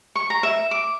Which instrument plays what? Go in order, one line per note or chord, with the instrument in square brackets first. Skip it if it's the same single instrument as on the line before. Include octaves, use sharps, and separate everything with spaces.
[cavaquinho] C#6
A#5
E5
D6